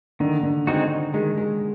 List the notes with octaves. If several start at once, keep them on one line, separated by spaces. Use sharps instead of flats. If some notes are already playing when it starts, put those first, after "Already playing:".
D3 D#3
D3
D#3 G#3 C4 D#4 F#4
D#3 G#3
G#3